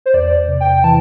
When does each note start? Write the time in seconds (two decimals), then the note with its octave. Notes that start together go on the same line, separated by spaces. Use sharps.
0.06 C5
0.14 E2 D5
0.48 C3
0.60 G5
0.84 E3 A5